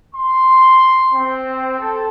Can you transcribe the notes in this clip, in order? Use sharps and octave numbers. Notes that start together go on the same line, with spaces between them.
C6
C4
A4